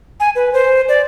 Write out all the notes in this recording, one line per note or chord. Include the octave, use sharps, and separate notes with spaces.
G#5
B4
C5
D5